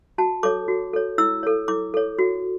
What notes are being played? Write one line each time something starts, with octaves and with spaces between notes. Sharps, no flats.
F#4 A5
A4 C#5 D6
F#4
A4 C#5
E4 E6
A4 C#5
E4 D6
A4 C#5
F#4